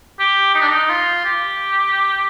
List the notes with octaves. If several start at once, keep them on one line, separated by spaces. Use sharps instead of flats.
G4
D#4
D4
D#4
F4
G4